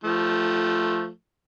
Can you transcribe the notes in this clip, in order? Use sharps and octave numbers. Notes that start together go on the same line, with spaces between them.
F3 A3